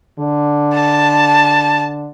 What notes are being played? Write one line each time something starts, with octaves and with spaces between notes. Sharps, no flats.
D3
A5